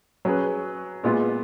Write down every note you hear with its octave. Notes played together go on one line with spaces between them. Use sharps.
F#3 C#4 G#4 B4
A#2 G#3 B3 F4